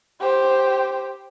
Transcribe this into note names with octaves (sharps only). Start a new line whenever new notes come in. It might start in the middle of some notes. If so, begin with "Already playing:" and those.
G4 C5